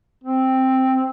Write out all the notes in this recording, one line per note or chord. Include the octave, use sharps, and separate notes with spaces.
C4